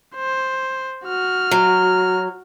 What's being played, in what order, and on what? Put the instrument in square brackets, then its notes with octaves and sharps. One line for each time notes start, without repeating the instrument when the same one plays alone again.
[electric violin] C5
F#4 F6
[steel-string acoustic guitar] F#3